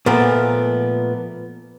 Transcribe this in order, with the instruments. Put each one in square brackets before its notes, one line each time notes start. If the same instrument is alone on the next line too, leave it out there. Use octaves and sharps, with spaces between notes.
[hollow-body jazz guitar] A#2 F3 A3 B3